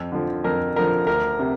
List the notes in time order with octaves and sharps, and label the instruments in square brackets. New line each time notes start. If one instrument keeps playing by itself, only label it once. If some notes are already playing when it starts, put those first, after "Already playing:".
Already playing: [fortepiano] F2
D3 F3
F2 A#4
D3 F3 A#4
D2 A#4
C3